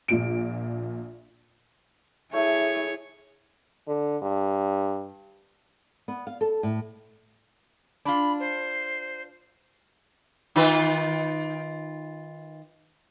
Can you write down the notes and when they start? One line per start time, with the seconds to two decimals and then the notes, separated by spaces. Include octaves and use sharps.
0.08 A#1 A#2 D7
2.33 A3 E4 G#4 C#5
3.88 D3
4.22 G2
6.08 B3
6.27 F5
6.41 A4
6.63 A2
8.05 D4 F4 B5
8.39 C5
10.56 D#3 F4 B4